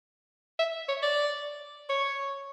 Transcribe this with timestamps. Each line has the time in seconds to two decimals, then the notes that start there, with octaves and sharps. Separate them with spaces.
0.59 E5
0.89 C#5
1.02 D5
1.89 C#5